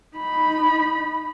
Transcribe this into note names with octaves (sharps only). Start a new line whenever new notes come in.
D#4 B5